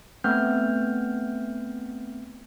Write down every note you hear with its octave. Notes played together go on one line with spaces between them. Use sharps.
A3 B3 C4 F6 G6